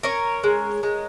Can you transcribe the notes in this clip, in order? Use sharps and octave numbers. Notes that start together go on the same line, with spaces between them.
C#4 A#4 C#5
G#3
G#3